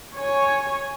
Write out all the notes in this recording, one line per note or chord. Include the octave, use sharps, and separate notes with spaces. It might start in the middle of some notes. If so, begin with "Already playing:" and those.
C#5 G#5